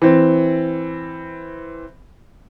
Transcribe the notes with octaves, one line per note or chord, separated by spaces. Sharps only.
E3 C4